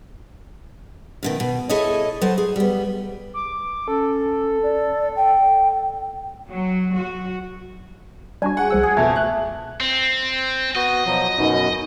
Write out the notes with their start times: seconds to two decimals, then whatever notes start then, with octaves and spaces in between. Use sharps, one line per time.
1.23 F#2 B2 D#3
1.40 B2
1.69 E4 G#4 A4 C#5 D#5
2.21 F#3 A4 C5
2.38 G#4
2.56 G3 B3
3.34 D6
3.88 C#4 A4
4.63 D5
5.16 G5
6.47 F#3
6.94 F#4
8.42 G3 D4 F#4 G#5
8.57 G#4 F#5
8.71 C2 F3 E6
8.83 G#4
8.97 F2 B2 A3 E5
9.16 F#6
9.80 C4
10.75 B3 F#4 D#5
11.06 B2 F3 F#3
11.38 F#2 B2 D#4